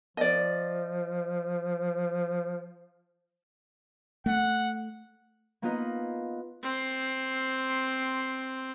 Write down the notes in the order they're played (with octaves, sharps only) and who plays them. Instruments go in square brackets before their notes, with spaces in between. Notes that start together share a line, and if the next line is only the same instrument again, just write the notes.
[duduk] F3 [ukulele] D5 D#5
[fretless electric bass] A3 [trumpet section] F#5
[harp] A#3 B3 D#4 F4 B4 D#5
[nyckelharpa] C4 C6